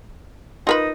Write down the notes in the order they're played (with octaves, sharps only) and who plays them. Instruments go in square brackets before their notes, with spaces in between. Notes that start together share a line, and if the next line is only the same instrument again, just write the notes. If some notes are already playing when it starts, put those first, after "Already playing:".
[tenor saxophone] D#4 [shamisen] F4 A#4 B4